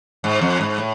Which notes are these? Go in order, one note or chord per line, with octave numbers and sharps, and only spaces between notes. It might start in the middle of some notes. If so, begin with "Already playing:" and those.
G#2
F2
G#2
A2